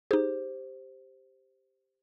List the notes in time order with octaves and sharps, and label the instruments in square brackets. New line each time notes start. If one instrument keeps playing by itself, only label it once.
[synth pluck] D#4 G#4 [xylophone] G4 C5